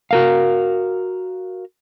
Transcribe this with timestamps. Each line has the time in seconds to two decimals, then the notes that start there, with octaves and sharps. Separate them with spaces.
0.11 F#4 A#4 F5